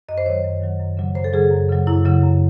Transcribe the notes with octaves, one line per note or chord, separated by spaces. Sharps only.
F#2 D#5
C5
D#3 F#3 C#5
F#2
D#3 F#3
F#2
C#3 F#3
F#2 C5
A4
C#3 F#3 G#4
F#2
C#3 F#3
F#2 E4
C#3 F#3
F#2